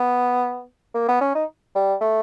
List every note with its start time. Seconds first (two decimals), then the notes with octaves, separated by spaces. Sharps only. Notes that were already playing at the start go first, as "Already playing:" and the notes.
Already playing: B3
0.94 A#3
1.08 B3
1.21 C#4
1.35 D#4
1.76 G3
2.01 A3